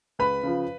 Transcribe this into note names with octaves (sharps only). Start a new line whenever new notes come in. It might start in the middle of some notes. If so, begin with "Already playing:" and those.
C#2 B4 B5
C#3 F3